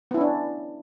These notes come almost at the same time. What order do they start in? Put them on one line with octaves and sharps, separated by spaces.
B3 E4 C#4 D4